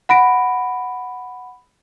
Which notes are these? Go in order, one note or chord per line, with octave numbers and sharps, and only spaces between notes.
F#5 B5 A#6 D7